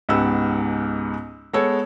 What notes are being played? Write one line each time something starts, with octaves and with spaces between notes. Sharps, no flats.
C#2 G#2 B3 G4 E6
G#3 B3 A4 C#5